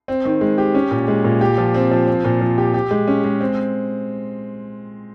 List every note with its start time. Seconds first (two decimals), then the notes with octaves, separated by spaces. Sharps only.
0.08 C4
0.25 D#3
0.41 G#3
0.58 G4
0.75 C#4
0.91 A#2
1.08 G#3
1.24 A#2
1.41 G4
1.58 F3
1.74 C4
1.91 F3
2.07 C4
2.25 A#2
2.41 F3
2.58 G4
2.74 G4
2.91 G#3
3.08 C#4
3.24 G#3
3.40 C4